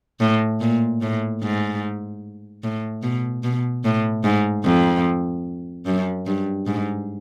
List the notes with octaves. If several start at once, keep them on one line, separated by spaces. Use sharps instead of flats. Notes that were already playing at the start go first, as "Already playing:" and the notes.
A2
A#2
A2
G#2
A2
B2
B2
A2
G#2
F2
F#2
G2
G#2